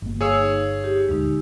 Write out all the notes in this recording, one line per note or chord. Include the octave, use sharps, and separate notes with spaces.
G1 A#3
G#4 C#5 F5 E6
D#4
G4
D#1 D2 G#3 D#4